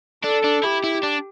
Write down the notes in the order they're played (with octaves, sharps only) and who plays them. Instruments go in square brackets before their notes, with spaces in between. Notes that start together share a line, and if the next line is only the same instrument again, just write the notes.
[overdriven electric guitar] D4 [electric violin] A4
[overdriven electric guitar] D4
[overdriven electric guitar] E4 [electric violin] G4
[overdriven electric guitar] E4
D4